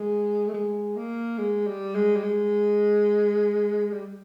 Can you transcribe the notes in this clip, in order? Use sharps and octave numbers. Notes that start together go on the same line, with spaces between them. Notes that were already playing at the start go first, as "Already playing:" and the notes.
Already playing: G#3
A3
G#3
A#3
G#3
G3
G#3
G3
G#3
G3